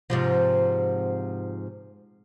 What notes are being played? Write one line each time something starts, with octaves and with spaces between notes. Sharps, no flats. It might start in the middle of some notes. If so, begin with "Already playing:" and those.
G#2 C3 F3